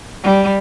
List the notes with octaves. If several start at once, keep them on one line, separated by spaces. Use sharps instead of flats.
G3